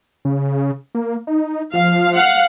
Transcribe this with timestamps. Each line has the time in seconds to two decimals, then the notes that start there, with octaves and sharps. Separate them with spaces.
0.25 C#3
0.95 A#3
1.27 D#4
1.74 F3 F5
2.15 F5 F#5